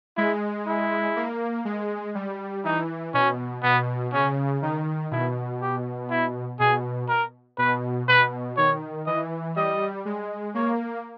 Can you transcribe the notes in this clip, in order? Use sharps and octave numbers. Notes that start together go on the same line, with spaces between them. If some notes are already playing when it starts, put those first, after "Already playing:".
G#3 E4
E4
A#3
G#3
G3
E3 D#4
B2 C#4
B2 B3
C#3 C#4
D#3 D#4
B2 E4
G4
E4
B2 G#4
A#4
B2 B4
B2 B4
D#3 C#5
E3 D#5
G3 D#5
G#3
A#3 C#5